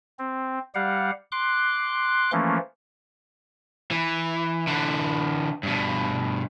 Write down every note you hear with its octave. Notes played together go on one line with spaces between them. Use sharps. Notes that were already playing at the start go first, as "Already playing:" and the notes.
C4
G3 G4 F5 F#5
C6 D6 F#6
E3 F3 A3 A#3 C#4
E3
D3 E3
G2 B2